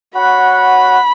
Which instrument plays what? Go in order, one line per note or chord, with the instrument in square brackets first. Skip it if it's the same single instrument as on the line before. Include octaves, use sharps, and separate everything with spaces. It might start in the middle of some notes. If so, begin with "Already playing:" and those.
[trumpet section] F#4 C#5 F#5 [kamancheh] B5
[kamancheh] B5